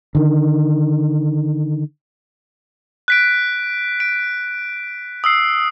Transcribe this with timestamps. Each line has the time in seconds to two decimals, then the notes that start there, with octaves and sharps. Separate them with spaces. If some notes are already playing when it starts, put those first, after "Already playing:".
0.15 D3 D#3
3.08 F#6 B6 D7
4.00 D7
5.24 D#6 E6 C7